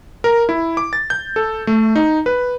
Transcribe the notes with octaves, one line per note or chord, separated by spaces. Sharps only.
A#4
E4
D6
A6
G6
A4
A3
D#4
B4